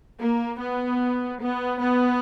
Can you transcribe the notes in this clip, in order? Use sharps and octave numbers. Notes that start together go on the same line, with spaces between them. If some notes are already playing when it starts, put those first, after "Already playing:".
A#3
B3
B3
B3